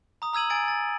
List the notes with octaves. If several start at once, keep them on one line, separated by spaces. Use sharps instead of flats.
A#5 D#6
A#5 E6 G#6 D#7 F#7
G#5 G#6 A6 D7
A6